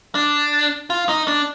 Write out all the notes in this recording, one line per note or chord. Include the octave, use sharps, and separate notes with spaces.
D4
F4
D#4
D4